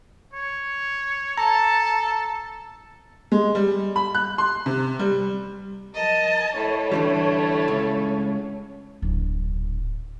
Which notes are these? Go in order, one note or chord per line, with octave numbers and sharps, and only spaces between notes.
C#5
A4 A5 A#5
G#3
G3
B5
F#6
C6
C3
G3
A#4 D#5 A5
A2 A3 C#5
D3 E3 G3
C#2
D1 A#1